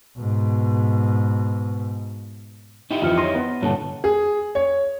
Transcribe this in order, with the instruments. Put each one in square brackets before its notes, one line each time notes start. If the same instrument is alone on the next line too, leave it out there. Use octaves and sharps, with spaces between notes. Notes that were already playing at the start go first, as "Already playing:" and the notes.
[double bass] G#2 B2
[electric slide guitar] D#4 E4 G4
[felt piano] F2 E3 [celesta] F4 F6 C#7
[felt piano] C#5 C6 [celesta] A#6 D#7
[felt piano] B3 B4
[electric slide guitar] G2 A#2 A3 [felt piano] D3 D4 [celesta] C#5 A5
[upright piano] G#4
C#5